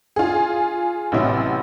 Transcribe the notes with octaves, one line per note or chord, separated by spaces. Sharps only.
F4 G#4
A1 C3 F#3 E4